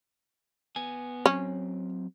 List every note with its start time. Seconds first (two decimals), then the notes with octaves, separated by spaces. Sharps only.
0.76 B3 G#5
1.26 F#3 C4 C#4